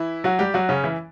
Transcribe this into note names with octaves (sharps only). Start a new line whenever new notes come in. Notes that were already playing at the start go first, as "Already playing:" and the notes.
Already playing: E3 E4
F#3 F#4
G3 G4
F#3 F#4
C#3 C#4
E3 E4